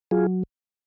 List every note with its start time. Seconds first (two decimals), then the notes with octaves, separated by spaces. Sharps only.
0.11 F#3 F4 G#4